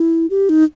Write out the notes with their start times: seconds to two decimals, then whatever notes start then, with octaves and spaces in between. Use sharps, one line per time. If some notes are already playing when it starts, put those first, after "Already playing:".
Already playing: E4
0.30 G4
0.49 D#4